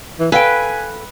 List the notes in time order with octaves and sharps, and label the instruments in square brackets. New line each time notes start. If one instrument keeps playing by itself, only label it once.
[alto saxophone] E3
[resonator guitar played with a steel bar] A4 F5 G5 [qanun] B4 [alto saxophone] G#5